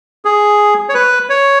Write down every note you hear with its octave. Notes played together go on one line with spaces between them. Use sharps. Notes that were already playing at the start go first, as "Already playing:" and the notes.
G#4
C#5
B4
C#5